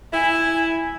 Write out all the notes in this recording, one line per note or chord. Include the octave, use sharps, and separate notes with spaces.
E4 G#5